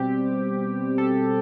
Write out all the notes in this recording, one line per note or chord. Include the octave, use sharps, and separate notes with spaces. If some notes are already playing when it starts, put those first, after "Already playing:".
Already playing: B2 G3 C4 G4
A4